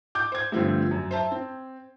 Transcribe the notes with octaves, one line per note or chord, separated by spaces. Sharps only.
D6 G6
C5 G#6
G2 D3 F3 A3 C4
F#2
C5 E5 A5
C4